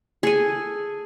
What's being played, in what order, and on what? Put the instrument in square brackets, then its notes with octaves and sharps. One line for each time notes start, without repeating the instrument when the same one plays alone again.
[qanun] G#4 A4 G#5